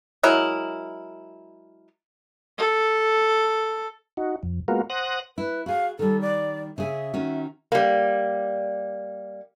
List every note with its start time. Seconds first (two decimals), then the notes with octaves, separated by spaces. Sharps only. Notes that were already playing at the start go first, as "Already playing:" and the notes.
0.23 F#3 G#3 E4 A#4
2.58 A4
4.17 D#4 F#4
4.43 F2
4.68 G#3 A#3 B3 F4 F#4 A#4
4.90 C5 F#5 D#6 F#6 A#6
5.38 E4 B4
5.66 F#4 G#4 F5
5.99 D#3 G3 A4
6.21 D5
6.78 C#3 G#4 E5
7.14 D#3 C#4 F#4
7.72 G3 A#3